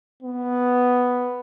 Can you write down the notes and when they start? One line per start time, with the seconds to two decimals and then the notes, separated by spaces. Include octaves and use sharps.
0.22 B3